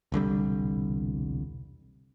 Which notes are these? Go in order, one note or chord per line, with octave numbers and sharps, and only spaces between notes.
E1 C2 D3 G3